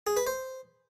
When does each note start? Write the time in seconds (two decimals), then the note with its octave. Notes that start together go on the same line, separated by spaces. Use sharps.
0.07 G#4
0.17 B4
0.27 C5